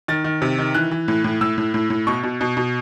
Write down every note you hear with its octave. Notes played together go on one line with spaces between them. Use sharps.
D#3 A6
D#3
C3
D#3
E3 F#6
E3
A2
A2
A2 E6
A2
A2
A2
B2 C#6
B2
B2
B2